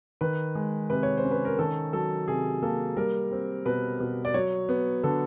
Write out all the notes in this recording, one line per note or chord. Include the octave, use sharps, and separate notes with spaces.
D#3 B4
G#3
C3 B4
C#5
C5
C#4
B4
A#4
D#3 A4
F#3 A4
C3 G#4
A#3 A4
G3 A#4
C4
B2 B4
B2
D5
F#3 C#5
B3
D3 A4